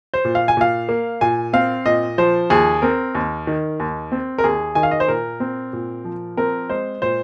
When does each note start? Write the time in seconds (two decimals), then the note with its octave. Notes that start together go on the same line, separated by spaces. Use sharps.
0.14 C5
0.25 A#2
0.35 F5
0.48 G#5
0.57 A#2 F5
0.89 A#3
1.21 A#2 G#5
1.53 C4 F5
1.86 A#2 D#5
2.18 F3 C5
2.50 D#2 G#4
2.82 C4 A#4
3.15 D#2
3.47 D#3
3.80 D#2
4.12 C4
4.38 A#4
4.44 D#2 G#4
4.75 D#3 G#5
4.83 F5
4.91 D#5
5.00 C5
5.08 A#2 A#4
5.40 C4
5.73 A#2
6.05 F3
6.37 C4 A#4
6.70 G#3 C5
7.02 A#2 C5